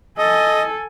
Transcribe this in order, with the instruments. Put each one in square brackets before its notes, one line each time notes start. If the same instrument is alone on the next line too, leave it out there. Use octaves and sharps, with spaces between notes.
[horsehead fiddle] A4 G#5 [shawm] D#5